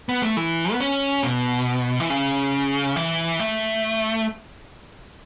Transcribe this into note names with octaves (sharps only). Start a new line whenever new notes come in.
B3
A3
E3
B3
C#4
B2
E3
C#3
E3
A3